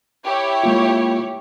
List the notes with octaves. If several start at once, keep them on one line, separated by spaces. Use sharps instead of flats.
E4 G4 C#5
G#3 A#3 F4